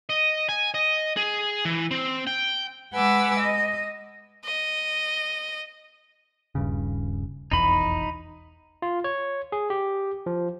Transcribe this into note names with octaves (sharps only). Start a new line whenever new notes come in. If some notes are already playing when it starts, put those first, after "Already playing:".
D#5
G#5
D#5
G#4
E3
C4
G5
G#3 B4 F#5 G#5 D6 E6
D#5
D#5
D#1 G2 C#3
F1 B1 E2 D#4 B5
F4
C#5
G#4
G4
F3